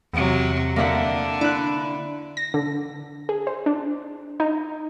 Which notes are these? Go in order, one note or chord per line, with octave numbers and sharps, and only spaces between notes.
E2 C3 F#3
D3 A#3 E5 F#5
D4 E4 F#6
A#6
D3
G#4
C5
D4
D#4